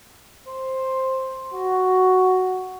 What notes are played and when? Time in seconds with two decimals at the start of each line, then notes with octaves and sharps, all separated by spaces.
0.48 C5
1.54 F#4